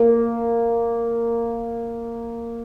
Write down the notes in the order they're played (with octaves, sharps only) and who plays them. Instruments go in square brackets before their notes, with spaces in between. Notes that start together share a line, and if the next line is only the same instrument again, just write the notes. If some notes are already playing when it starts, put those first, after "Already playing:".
Already playing: [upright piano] A#3